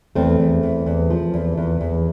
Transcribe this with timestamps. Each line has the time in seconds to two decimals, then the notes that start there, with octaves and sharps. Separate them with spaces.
0.15 E2 A3 C4
0.40 E2
0.63 E2
0.86 E2
1.10 F3
1.34 E2
1.57 E2
1.81 E2